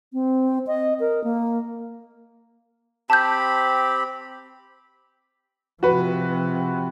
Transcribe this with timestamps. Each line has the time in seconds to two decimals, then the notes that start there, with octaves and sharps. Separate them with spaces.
0.13 C4
0.67 D#5
1.00 A#4
1.24 A#3
3.10 C4 G4 A5 B5 G6
5.83 C3 F3 F#4 B4